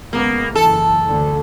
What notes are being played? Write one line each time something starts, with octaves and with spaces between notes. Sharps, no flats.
C#2 A#3 B3
F#1 E3 A4
D2 D3